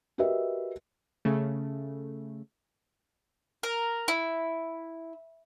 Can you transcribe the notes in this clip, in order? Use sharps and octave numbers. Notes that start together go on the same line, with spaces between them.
F#4 G4 A#4 B4 D#5 E5
C#3 A3
A#4
E4